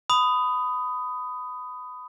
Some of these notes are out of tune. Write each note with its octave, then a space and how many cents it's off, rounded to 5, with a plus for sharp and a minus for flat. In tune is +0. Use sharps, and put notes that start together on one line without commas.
B5 +20 D#6 +0